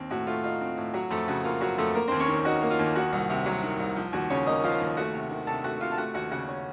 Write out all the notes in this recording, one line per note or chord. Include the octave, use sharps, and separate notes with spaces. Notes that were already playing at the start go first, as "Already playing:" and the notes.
Already playing: D#2 C4
A2 F#4
A3 F4
D#4 F4
C4
A2
F#3 F#4
F2 A3 A4
C#3 F#4
A#3 F4
F#3 F#4
F2 A3 A4
A#3 A#4
D#2 C4 C5
C#4 C#5
D#3
D#4 F#4
A#3
F4
D#2
D#3 F#4
C2
C3
F#3
D#3
C2
F3
D#2 F#4
C#3 C#4 C#5
A#3 D#4 D#5
F3 F4 F5
D#2
A3 F#4 F#5
C3
D#3
C3 A4 A5
A3 F#4 F#5
C3 F4 F5
A5
A3 F#4 F#5
D#2 F#4 F#5
C#3 F#4 F#5
C#4